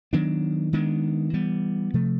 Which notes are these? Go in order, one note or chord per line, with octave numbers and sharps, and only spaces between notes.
D#3 F#3 B3 D4
D#3 G#3 B3 D4
E3 G3 B3
C3 F3 A3